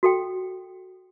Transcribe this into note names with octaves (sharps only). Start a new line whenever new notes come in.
F#4 A4 G5